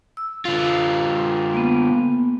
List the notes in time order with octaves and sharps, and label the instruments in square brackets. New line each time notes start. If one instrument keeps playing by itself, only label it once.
[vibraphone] E6
[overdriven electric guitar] D3 F4
[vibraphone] A#3 B3